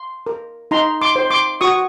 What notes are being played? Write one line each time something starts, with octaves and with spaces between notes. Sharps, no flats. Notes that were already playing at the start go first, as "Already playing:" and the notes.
Already playing: C6
A#4
D#4 A#5 C6
C6 D6
C5
C6 D6
F#4 C#6 D#6